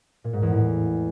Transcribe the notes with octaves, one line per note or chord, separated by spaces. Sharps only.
A#2
G#2
E2
A2